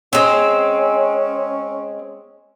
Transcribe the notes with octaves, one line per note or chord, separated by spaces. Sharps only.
G#3 C4 C#4